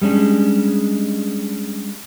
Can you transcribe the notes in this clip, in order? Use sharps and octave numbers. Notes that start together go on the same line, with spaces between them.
G3 G#3 C#4 D4